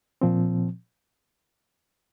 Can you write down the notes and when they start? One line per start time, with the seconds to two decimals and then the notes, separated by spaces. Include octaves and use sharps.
0.21 A#2 F3 C4